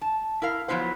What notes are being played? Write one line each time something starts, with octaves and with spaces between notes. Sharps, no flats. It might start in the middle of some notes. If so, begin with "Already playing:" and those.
A5
E4 A#4 F5
F3 F#3 B3 E4 C5